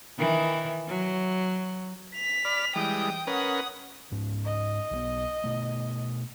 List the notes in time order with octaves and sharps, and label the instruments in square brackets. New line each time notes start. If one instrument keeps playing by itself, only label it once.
[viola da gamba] D#3 E3
F#3
[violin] B6 F7
[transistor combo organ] D5 B5 F6
[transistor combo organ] E3 G3 G#3 [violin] G5 D#6
[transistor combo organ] C#4 A#4 B4 [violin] F#5 D#6
[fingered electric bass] G#2 C#4
[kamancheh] D#5
[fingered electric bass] B1 D#3 B3
B2 A3